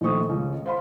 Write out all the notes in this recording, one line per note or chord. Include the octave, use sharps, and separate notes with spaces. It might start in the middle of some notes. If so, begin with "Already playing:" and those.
A#1 D#3 A3 C5 C#6 D#6
C#2
C5 F5 B5 C6